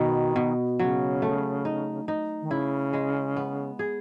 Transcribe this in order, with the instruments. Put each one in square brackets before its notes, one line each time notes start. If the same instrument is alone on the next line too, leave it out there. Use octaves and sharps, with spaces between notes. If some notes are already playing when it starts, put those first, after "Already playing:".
Already playing: [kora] B2 B3 [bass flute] D#3
[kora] B2
[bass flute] C#3 [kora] F#3
[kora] A3
D#4
D#4
[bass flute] D#3
[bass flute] C#3 [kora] E4
[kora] G#3
B3
G#4